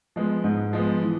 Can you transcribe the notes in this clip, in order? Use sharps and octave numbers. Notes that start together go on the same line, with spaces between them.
F3 G#3 B3
G#2
F3 G#3 B3
E3